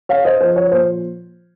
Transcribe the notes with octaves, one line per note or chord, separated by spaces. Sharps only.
C#3 C#5 F5
C5 D#5
F3 C5
C#5
A#2 C5